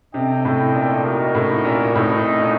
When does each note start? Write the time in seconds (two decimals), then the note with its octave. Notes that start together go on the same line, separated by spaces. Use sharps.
0.14 C3 D4 A4 D#5 G5
0.45 A2
0.75 A#2
1.05 D#4 F#4 A#4
1.35 A2
1.65 A#2
1.95 A2 A3 C4 D#4
2.41 A#2